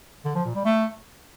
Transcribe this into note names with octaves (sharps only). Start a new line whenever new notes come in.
D3
F3
A#2
G3
A3